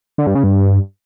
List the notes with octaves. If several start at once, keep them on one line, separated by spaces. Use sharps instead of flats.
D3
G2
C#3
G2